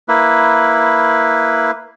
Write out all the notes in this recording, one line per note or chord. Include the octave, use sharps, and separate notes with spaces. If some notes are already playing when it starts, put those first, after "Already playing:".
A#3 E4 B4